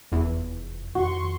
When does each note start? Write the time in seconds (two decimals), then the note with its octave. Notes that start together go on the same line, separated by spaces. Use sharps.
0.12 F1 E2
0.95 F2 D#3 F#4 C6 C#6